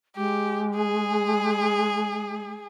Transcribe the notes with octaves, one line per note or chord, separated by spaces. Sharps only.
G#3 G4
G#4